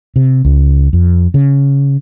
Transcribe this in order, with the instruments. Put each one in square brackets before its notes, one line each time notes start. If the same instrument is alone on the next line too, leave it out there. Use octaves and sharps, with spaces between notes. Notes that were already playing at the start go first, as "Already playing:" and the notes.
[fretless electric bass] C3
C#2
F2
C#3